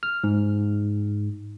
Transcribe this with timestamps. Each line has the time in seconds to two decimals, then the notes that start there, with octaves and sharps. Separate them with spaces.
0.03 F6
0.24 G#2